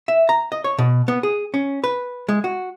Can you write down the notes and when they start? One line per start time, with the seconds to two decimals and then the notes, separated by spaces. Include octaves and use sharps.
0.08 E5
0.29 A#5
0.52 D#5
0.64 C#5
0.79 B2
1.08 B3
1.23 G#4
1.54 C#4
1.84 B4
2.29 G#3
2.44 F#4